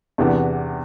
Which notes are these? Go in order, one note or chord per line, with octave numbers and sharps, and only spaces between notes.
E2 C3 E3 B3 D4